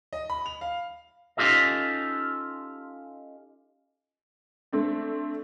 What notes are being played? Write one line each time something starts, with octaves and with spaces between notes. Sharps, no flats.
D#5
B5
F7
F5
C#4 D#4 F4 G4 A4 D#5
A3 C4 D4